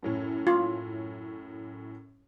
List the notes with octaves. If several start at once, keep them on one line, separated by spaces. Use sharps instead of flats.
F#2 A2 C#4
F4